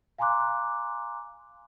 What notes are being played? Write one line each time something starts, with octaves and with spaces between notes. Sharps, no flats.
F5 G#5 A#5 C6 D6 F#6